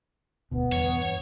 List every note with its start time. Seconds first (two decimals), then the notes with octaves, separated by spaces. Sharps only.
0.51 E1 D2 B2 B3
0.72 E2 G2 C#5